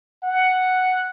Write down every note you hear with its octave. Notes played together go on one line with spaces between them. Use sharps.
F#5